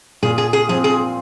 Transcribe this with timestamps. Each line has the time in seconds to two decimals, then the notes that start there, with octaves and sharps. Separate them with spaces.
0.23 A#2 G#4
0.38 G#4
0.53 G#4
0.69 F3 C4 G#4
0.84 G#4